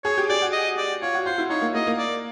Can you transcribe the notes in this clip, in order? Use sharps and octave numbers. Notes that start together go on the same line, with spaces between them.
G#4 C#5
G4
G4 D5
F#4
D#5
D5
F4 C#5
F#4
F4 C5
E4
D#4 C#5
A#3
A#3 D#5
A#3
D5